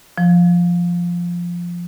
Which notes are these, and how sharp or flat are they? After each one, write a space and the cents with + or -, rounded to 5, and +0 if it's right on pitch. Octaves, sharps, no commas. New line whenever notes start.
F3 -5